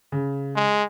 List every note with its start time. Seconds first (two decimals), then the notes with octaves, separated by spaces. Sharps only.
0.12 C#3
0.56 G#3